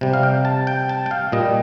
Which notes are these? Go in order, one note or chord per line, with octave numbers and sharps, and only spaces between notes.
C3 G3
F5
G5
A5
G5
A5
G5
F5
A#2 G3 D#5